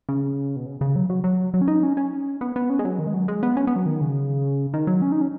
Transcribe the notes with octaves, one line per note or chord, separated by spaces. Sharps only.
C#3
B2
C#3
C#3
F#3
F#3
F#3
F#3
C#4
D#4
C#4
C#4
B3
B3
C#4
G#3
F#3
D#3
G#3
F#3
G#3
B3
C#4
B3
F#3
D#3
C#3
D#3
F#3
C#4
D#4
C#4